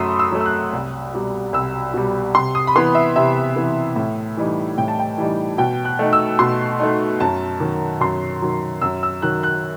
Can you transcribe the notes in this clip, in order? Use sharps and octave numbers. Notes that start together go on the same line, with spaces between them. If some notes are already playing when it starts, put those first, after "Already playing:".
Already playing: F#2 A3 B5 C6 D#6 E6
E6
F#3 A3
E6
F#6
C2
B2 G3
C2 E6
B2 G3
C3 C6
D#6
B5
E3 B3 C6
E5
C3 E5
E3 B3
A2
E3 G3 D#4
A2 G5
A5
G5
E3 G3 D#4
B2 G5
F#6
A3 D#4
E6
B2 C6
A3 D#4
F#2 A5
D#3 F#3
F#2 C6
D#3 F#3
F#2 E6
E6
D#3 F#3 F#6
F#6